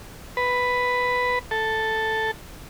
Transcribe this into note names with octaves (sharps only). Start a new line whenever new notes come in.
B4
A4